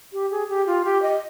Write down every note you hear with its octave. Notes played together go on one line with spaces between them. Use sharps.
G4
G#4
G4
F4
G4
D#5